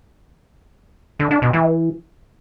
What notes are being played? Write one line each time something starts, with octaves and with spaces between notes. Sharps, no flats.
D3
D4
B2
E3